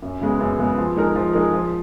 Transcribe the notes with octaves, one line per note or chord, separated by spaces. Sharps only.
F#2
C#3 G#3 B3
F#2
C#3 G#3 B3
F3
G#3 D#4 A#4
F3
G#3 D#4 A#4
F3